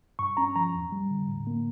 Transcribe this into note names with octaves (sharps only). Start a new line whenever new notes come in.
G2 C#6
C#4 A#5
F3 A#5
E2
G3
D3
A2
A#3